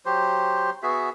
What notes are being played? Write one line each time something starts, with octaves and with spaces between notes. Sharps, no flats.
F#3 G4 C5
B3 F#4 G#4 E5